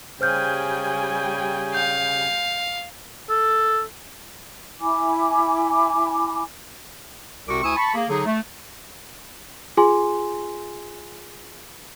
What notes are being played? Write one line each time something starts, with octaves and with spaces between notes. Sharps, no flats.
C#3 G3 C5 G5 G#5 F6 G6
F5 G6
A4
E4 G#5 B5 D6
C2 C3 C4 F#4 C#6 D6
D2 E4 G#5 C#6 D#6 E6
A5 B5 C#6
A#3 G#4
D3 F#3 D#4 G#4
A3
F4 G#4 G#5 C6